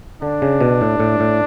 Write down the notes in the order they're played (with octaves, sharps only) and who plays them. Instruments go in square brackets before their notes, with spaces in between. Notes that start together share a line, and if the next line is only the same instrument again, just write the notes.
[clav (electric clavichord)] D3 [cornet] D4
[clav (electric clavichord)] C#3
B2
A2
A2
A2